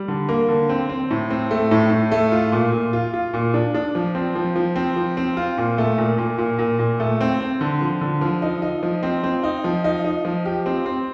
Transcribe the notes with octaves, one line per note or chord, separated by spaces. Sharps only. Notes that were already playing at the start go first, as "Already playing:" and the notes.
Already playing: G3
D3
A#3
D3
C4
C4
A2
C4
A3
A2
A2
A3
F4
A#2
A#2
F4
F4
A#2
D4
D4
F3
C4
F3
F3
C4
F3
C4
F4
A#2
A3
A#2
A#2
A#2
A#2
A#2
A3
C4
C4
D3
F3
D3
F3
D#4
D#4
F3
C4
C4
D#4
F3
D#4
D#4
F3
G4
C4
C4